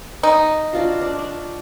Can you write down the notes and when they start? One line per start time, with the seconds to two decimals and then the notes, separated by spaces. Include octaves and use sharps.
0.23 D#4
0.73 D4 F4 F#4
1.01 D4
1.19 D4